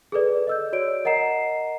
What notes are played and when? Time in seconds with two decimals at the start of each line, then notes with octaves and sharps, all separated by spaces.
0.12 G#4 A4 B4 D5
0.47 D#5 E6 G6
0.73 F#4 C#5 D5 D7
1.05 A#4 D#5 F#5 A#5 C7 E7